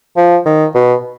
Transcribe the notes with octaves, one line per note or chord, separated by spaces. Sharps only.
F3
D#3
B2